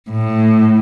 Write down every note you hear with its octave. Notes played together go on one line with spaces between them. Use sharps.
A2